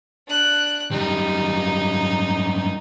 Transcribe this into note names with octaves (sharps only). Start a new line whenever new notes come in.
D4 F#6
F#2 G3 D#4